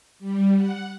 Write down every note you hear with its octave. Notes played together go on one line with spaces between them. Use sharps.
G3
F#5